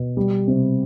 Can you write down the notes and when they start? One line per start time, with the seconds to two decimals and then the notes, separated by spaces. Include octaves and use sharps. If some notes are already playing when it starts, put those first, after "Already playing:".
Already playing: B2
0.17 G3
0.48 C3